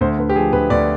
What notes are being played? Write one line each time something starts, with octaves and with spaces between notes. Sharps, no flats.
D2 C5
D2 B4
G4
F3 G#4
D2 B4
D2 D5